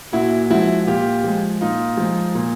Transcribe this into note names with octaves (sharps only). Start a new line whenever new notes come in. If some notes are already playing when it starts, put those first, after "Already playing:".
A#2 E4 F#4
F3 G#3 E4 F#4
A#2 F4 G4
F3 G#3
A#2 D#4 F4
F3 G#3
A#2